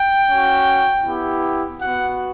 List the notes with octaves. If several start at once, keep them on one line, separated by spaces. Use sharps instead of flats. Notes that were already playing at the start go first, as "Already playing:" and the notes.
Already playing: G5
C#4 F#4
B3 E4 G4
B3 F#4 F#5